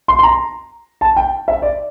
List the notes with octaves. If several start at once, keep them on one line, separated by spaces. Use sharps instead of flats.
C6
C6
A#5
A5
G5
E5
D5